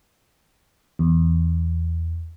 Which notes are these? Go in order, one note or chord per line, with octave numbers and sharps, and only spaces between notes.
E2